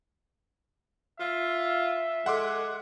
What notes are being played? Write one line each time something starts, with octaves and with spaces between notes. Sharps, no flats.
F4 E5
G#3 A4 F#5 C6 D6